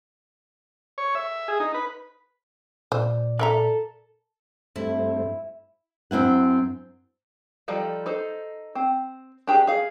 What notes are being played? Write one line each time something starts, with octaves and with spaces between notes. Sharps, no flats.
C#5
E5
G#4
D#4
B4
A#2 C5 D5
A4 A#4 E5 A#5
G2 A3 C4 E4
F#2 C4 E4 F#5
F3 G3 D#4 A4 D5
D#4 A4 C5
C4
D4 G4 G#4
G#4 F5